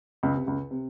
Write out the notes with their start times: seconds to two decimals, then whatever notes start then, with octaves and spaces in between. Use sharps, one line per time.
0.23 C#2 C#3
0.35 C3
0.46 C#2 C#3
0.71 C3